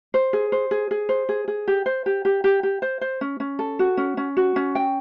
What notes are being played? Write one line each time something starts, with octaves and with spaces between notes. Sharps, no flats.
C5
G#4
C5
G#4
G#4
C5
G#4
G#4
G4
C5
G4
G4
G4
G4
C5
C5
C#4
C#4
A4
F#4
C#4
C#4
F#4
C#4
G5